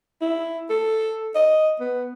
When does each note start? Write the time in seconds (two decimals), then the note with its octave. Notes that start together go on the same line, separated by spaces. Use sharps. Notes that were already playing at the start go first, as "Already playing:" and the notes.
0.21 E4
0.70 A4
1.35 D#5
1.80 B3